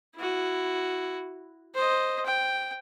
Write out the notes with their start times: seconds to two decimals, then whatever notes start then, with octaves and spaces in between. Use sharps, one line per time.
0.16 E4 F#4
1.74 C5 D#5
2.25 G5